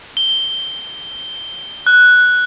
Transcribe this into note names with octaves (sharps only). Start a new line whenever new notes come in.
G7
F#6